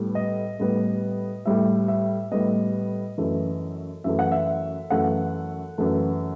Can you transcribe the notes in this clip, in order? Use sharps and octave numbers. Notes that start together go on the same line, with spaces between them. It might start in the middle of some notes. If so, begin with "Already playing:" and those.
Already playing: A2 G3 B3
D#5
A2 G3 B3
A2 G3 B3 E5
E5
A2 G3 B3 D#5
F#2 E3 A3
F#2 E3 A3 E5
F#5
E5
F#2 E3 A3 F#5
F#2 E3 A3